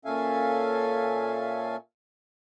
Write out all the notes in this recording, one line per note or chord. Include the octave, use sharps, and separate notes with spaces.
A#2 C#4 A4 E5 F5 G#5